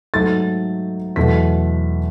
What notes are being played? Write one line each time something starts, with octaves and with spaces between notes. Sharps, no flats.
G#2 F#3 A3 A6
E2 B2 F#3 A3 B6